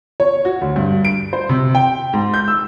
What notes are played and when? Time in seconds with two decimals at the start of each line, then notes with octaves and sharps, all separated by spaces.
0.20 C#5
0.45 F#4
0.61 D2
0.76 G2
1.05 D7
1.33 C5
1.49 C3
1.75 G5
2.13 G#2
2.34 G6
2.48 E6